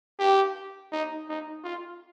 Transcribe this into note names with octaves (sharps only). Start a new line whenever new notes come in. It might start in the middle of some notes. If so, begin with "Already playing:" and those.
G4
D#4
D#4
F4